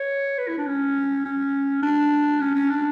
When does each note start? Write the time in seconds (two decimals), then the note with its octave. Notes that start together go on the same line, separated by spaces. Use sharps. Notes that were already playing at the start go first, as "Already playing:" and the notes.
Already playing: C#5
0.38 B4
0.48 E4
0.58 D4
0.67 C#4
1.25 C#4
1.82 D4
2.40 C#4
2.55 C#4
2.69 D4